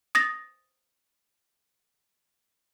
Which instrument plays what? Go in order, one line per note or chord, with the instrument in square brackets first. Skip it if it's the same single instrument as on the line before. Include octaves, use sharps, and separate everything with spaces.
[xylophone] D#6 A6 A#6